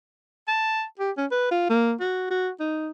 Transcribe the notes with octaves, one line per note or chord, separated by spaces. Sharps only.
A5
G4
C#4
B4
F4
A#3
F#4
F#4
D#4